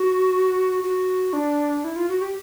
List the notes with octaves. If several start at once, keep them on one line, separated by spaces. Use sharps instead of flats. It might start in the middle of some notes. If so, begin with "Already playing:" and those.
Already playing: F#4
F#4
D4
E4
F4
F#4
G4